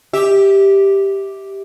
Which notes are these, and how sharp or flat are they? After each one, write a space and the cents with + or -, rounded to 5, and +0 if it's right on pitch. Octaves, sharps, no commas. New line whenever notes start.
G4 +0 E5 -25